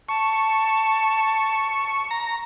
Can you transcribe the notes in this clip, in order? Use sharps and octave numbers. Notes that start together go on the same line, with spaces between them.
A5 C#6
A#5